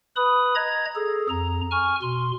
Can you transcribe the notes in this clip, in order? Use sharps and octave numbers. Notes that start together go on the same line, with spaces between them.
B4 B5 D#6
D#5 A#5 G#6
G#4 A4
F2 A#5
G#5 C#6 F6
B2 C6